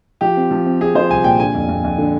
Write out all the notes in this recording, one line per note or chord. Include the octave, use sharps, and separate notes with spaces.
F3 G4
C4
F3
C4
C4 G#4
F3 C5
C2 G#5
A#2 G5
D3 G#5
F2
F2
F2
D3